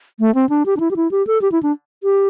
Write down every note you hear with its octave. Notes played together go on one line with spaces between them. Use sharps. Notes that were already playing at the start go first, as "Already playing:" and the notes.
A3
C4
D4
G4
D4
E4
G4
E4
G4
A4
G4
E4
D4
G4